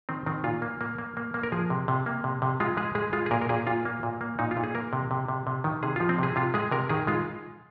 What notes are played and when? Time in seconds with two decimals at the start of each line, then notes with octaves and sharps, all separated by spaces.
0.09 D#3 C4
0.26 D#3 C4
0.44 A#2 F4
0.62 A#3
0.81 A#3
0.98 A#3
1.17 A#3
1.34 A#3
1.43 A#4
1.52 F3 G#4
1.70 C3
1.88 C3
2.06 A#3
2.24 C3
2.42 C3
2.60 G#3 F4
2.77 G#3 G#4
2.95 G#3 G#4
3.13 G#3 F4
3.26 G#4
3.31 A#2 A#4
3.41 A#4
3.49 A#2 G#4
3.67 A#2 F4
3.85 A#3
4.03 A#2
4.21 A#3
4.39 A#2 D#4
4.51 F4
4.57 A#2
4.64 G#4
4.75 A#3 A#4
4.93 C3
5.11 C3
5.28 C3
5.47 C3
5.64 D#3
5.83 C3 G#4
5.96 F3 F4
6.09 C4
6.18 C3 G#4
6.36 C3 F4
6.54 G#3 G#4
6.71 C3 A#4
6.89 D#3 G#4
7.07 G#3 F4